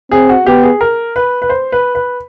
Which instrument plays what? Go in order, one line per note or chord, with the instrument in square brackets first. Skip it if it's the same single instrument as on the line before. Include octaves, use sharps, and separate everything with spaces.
[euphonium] C4 [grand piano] G#4
[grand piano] F#4
[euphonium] B3 [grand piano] G4
[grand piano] G#4
A#4
B4
B4
C5
B4
B4